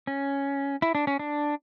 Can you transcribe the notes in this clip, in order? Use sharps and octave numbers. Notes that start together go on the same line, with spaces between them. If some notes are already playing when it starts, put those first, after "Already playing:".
C#4
E4
D4
C#4
D4